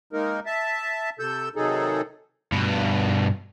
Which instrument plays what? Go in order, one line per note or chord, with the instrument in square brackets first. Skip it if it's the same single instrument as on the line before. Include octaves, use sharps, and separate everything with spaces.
[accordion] G#3 A#3 D#4 A#4
E5 A5
C3 A4 E6 G6
C3 D#3 F#3 D#4 G#4 A4
[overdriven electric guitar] G2 B2